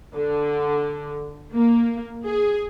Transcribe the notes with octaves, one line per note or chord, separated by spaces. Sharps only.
D3
A#3
G#4